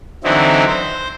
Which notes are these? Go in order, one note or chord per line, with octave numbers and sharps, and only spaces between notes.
D3 E3 F#3 C4 D#4 E4
C5